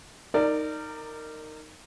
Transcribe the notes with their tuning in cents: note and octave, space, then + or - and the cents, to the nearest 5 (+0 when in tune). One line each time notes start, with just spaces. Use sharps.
D#4 +0 A#4 -20 D5 +10